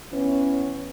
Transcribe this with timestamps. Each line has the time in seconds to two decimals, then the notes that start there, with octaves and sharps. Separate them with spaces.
0.13 E3 B3 C#4